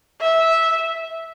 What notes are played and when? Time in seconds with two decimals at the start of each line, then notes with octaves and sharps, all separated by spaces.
0.21 E5